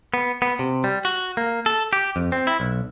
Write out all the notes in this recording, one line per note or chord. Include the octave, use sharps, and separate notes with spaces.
B3
B3
C3
G3
F#4
A#3
A4
G4
F2
C4
E4
B1